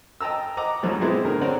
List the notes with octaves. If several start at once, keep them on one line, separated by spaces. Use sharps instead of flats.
D#5 G5 A5 A#5 E6
D#5 F#5 A#5 D6
C2 G#2 B2 F3 F#3
G#3 B3 C4 D#4 E4 G#4
A2 D3 A#4
C4 C#4 D5 F#5 A#5